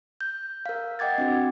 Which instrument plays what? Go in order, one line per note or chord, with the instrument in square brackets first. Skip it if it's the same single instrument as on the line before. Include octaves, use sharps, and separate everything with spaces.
[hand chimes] G6
A#4 F5
D#5 F#5 G5 D6 G#6 A6
C4 D4 F#4 G#6